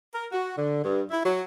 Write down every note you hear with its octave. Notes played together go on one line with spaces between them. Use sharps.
A#4
F#4
D3
G2
E4
F#3